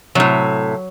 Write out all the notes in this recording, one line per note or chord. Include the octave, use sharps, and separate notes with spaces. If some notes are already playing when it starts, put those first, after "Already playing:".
A2 C3 F#3